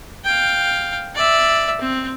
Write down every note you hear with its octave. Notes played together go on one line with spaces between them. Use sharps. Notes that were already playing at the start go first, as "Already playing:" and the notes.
F5 G5
D5 E5
C4